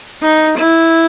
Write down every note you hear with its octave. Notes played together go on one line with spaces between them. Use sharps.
D#4
E4